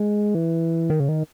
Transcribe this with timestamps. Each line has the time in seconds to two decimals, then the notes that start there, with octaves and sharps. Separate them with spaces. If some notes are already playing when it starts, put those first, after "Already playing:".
Already playing: G#3
0.35 E3
0.90 D#3
1.00 C#3
1.09 D#3